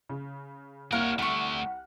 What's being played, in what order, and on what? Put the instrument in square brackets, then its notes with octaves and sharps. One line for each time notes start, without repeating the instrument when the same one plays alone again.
[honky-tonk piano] C#3
[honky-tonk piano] C2 F6 [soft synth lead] A#3 [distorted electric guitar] A#4 C#5 [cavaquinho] F5 F#5
[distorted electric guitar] D3 A3 [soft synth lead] F#5 [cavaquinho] B5 C#6